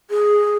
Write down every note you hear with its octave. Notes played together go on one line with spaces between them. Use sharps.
G#4